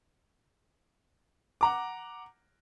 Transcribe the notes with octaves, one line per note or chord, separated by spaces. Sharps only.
F#5 A#5 D6